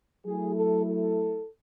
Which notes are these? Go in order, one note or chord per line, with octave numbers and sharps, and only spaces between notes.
F#3 A3 E4 G#4
A4
A4